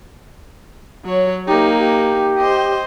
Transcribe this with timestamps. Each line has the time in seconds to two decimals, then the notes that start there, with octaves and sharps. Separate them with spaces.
1.05 F#3 C#5
1.48 A#3 D#4 G4
1.81 G4
2.39 C5 D#5